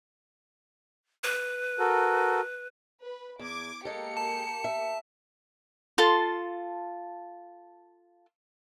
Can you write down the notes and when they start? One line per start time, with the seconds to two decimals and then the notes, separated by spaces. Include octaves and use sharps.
1.24 B4
1.79 F#4 A4 A#4
3.02 B4
3.39 E2 D6 G#6
3.85 G#3 A#3 G4 A4 C#7
4.17 A5
4.64 E5
5.98 F4 A4 A5 C6